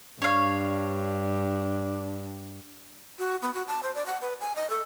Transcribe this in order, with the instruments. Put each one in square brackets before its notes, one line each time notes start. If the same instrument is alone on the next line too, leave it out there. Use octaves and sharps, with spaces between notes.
[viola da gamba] G2 [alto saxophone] D4 [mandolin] C#5 F5
[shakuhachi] F#4
B3
F#4
A5
C5
D5
F#5
B4
G#5
D#5
A4